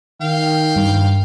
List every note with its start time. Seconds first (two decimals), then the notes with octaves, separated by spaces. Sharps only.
0.21 D#3 F5 G5
0.76 G2